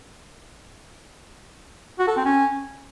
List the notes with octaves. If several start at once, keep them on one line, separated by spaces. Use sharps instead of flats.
F#4
A4
C4
C#4